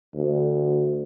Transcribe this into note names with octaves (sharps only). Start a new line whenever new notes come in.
D2